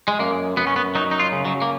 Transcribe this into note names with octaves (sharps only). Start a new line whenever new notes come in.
G#3
F#2 A#3
F#2 B3
C#4
B3
F#3 D#4
D#4
F4
C#3
F#3
A#3